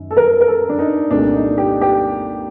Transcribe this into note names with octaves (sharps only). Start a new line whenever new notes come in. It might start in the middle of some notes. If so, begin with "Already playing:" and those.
Already playing: F#2 D#3
A4
A#4
A#4
A4
D4
D#4
C2 A#2 A3 D4
D#4
G4
G4